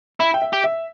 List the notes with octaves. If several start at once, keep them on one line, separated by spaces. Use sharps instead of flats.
E4 E5
G5
E5
G4
E5